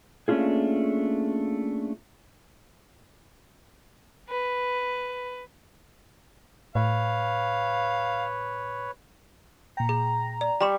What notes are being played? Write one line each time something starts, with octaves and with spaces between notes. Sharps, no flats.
A3 A#3 C#4 D4 F4 G#4
B4
A2 B4 C#5 F5
A#2 G5 A#5
G#4
D5
G3 A#5 B5 C#6 E7